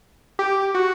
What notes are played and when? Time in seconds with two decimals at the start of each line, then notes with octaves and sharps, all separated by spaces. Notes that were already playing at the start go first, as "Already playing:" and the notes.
0.39 G4
0.74 F#4